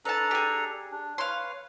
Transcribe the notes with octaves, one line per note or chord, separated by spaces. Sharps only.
D4 A4 B4 A5 A#5
G4 G#4
D4
B4 C#5 F5 C6